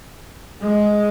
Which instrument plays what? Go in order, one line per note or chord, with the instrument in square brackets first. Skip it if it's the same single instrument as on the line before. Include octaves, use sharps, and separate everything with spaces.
[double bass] G#3